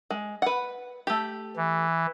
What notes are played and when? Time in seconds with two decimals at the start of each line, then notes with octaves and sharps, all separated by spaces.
0.10 G#3
0.42 B4 F#5
1.07 A3 G4
1.56 E3